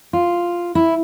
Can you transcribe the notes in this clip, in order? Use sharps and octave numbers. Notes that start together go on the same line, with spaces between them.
F4
E4